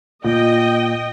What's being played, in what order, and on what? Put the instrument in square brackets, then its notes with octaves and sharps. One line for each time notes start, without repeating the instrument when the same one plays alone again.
[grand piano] A#2 [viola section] D#5 G5